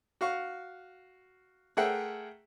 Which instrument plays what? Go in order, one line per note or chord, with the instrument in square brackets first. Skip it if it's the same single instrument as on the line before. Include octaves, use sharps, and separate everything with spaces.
[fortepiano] F#4 F5 C#6
A3 G#4 A#4 E5 F#5 G5